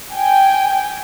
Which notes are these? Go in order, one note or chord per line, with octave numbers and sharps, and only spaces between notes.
G5 G#5